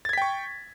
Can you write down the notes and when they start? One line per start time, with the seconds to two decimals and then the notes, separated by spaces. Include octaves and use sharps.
0.05 A6
0.09 G#6
0.13 B6
0.17 G5
0.22 C#6